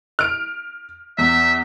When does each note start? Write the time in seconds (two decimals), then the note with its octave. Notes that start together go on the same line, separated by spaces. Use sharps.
0.19 F6 D7
1.18 E2 E5